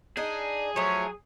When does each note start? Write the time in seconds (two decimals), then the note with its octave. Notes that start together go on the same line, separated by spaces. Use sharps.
0.17 D4 D#4 G#4
0.76 F3 F#3 A3 C#5